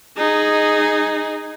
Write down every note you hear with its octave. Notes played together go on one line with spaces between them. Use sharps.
D#4 G#4